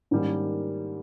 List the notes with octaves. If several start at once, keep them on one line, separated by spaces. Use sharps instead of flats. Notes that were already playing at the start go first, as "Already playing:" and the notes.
G#2 D#3 G3 A#3 C#4